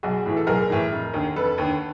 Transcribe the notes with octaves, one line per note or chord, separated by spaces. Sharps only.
B1 F#4 G#4
A2 E3
A4
B1 G#4 A#4
A2 E3
F1
D#2 D3
F1 A4 B4
D#2 D3